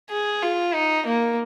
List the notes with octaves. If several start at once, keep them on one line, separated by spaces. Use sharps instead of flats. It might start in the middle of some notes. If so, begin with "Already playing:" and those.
G#4
F4
D#4
A#3